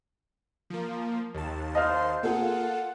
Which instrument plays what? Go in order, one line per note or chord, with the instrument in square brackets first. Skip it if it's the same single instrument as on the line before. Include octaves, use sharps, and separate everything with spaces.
[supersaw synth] F3 A#3
D#2 A5
[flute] C5 [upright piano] D#5 F5 F6
[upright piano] A#3 G#4 [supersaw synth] F4 A4 [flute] F#5